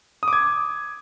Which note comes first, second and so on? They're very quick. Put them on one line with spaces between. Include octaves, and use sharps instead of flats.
D#6 D6 G#6